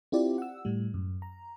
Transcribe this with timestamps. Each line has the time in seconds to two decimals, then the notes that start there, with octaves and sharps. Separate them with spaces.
0.12 C4 E4 F4 G4 D5
0.38 F#5 E6
0.65 A2 G3
0.94 F#2
1.22 A#5